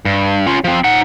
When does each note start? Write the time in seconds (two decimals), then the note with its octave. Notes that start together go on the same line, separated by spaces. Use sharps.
0.05 G2
0.47 C#4 F4
0.64 F3 C4
0.84 D#4 F#5